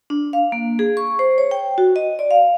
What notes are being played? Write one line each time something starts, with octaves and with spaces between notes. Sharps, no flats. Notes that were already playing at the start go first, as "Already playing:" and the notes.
D4
F5
A#3
G#4
C#6
C5
C#5
G5
F#4
D#5
D5
F5